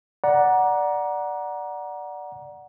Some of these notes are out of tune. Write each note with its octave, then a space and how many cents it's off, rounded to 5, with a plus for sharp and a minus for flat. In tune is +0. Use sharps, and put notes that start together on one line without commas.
D5 +0 F#5 +0 A#5 +20